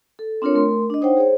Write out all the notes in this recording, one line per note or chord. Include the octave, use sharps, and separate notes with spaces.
A4
C4 D4 F4 A#4 C#5
A3 A#4 C6
D4 D#5
D#4 C5 C#5 F#5 G5
G#4 C5 C#5